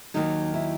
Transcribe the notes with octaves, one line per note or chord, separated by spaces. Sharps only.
D#2 D#3 F#3 D#4
E4